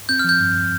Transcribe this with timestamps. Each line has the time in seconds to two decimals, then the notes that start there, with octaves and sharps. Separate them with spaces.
0.09 C4 G6
0.19 F6
0.24 F3 G6
0.40 G2